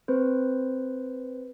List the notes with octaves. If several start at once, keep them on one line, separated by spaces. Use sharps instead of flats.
C4 B4 C5